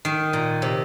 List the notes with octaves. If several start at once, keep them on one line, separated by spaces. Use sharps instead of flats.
D#3
A#2
C3